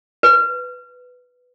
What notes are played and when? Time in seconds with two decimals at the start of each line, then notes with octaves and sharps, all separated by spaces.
0.23 B4